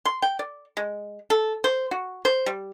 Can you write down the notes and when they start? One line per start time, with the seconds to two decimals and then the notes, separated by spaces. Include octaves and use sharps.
0.05 C6
0.22 G5
0.39 D5
0.77 G#3
1.30 A4
1.64 C5
1.91 F#4
2.25 C5
2.46 G3